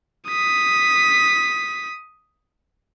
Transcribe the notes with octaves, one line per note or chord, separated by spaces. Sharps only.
D#6 B6